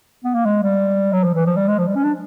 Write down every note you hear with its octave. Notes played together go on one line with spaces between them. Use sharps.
B3
A#3
G#3
G3
F#3
F3
E3
F3
G3
G#3
F3
G3
C#4
D4